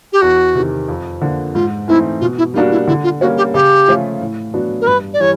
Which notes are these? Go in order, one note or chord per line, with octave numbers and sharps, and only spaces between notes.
G4
E2 F#4
C3 D#3
F2
D3 F3 A#3 D4
G#2 F4
E3 A3 C4 D#4 E4
B2 F4
E4
G3 A#3 D4 D#4 F#4
E4
D3 E4
F4
G3 A#3 C#4 F#4
G4
C#3 G4
F3 A3 C#4 F4
A2
F#3 B3 D4 F#4
A#4
G2 B4
D5
E3 G3 C#5